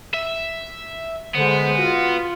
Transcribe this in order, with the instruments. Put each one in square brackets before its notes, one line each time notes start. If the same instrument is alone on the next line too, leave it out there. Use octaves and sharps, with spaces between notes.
[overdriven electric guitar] E5
[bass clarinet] D3 [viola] G#3 C5 [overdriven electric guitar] B3
[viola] F4 [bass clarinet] F#4